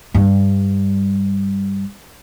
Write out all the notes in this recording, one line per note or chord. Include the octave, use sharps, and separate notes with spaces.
G2 G3